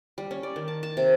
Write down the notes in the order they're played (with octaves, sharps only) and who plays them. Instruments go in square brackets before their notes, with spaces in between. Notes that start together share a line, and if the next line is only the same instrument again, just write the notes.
[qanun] G3
C#4
D5
D#3
A5
A5
C3